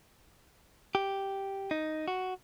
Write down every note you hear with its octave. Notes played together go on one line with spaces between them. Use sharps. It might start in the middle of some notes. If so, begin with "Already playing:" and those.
G4
D#4
F#4